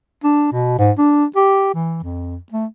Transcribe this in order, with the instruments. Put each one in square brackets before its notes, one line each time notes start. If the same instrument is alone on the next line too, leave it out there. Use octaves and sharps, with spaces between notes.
[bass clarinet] D4
B2
G#2
D4
G4
E3
F2
A3